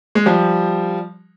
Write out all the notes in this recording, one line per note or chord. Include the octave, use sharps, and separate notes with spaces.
G#3
F3 G3